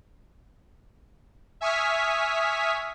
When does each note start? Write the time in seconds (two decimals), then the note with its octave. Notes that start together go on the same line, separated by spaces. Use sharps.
1.61 E5 G#5 C#6 D#6 F6 B6